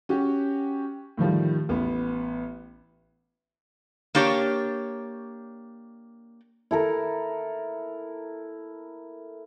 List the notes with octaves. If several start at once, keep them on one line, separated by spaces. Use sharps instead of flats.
C#4 F#4 G4
A2 D#3 F3 G3
A1 B3
A#3 D4 G4 C#5
E4 A4 A#4